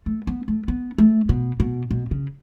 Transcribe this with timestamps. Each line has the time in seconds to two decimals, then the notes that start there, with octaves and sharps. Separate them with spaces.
0.06 A3
0.27 B3
0.48 A3
0.68 B3
0.98 A3
1.29 B2
1.60 B2
1.91 B2
2.11 C#3